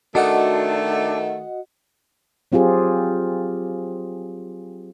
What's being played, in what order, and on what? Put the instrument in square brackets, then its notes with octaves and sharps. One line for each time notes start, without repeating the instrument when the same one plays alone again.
[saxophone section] D#3 A3 [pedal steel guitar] D4 [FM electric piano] F#4 D#5 F#5
[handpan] F#3 C4 F4 G4 G#4